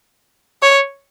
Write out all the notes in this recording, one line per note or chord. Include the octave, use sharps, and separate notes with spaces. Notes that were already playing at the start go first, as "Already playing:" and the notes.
C#5